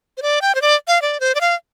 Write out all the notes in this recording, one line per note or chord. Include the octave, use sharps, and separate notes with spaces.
C5
D5
G5
C5
D5
F5
D5
C5
D5
F5